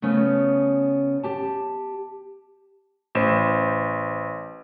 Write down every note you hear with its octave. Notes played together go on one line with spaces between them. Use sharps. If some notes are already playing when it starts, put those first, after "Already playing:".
C#3 A3 B3 C#4
G4 A5
A1 C5 E7